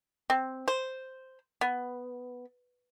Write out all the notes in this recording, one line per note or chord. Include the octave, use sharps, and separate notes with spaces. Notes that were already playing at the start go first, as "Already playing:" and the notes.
C4
C5
B3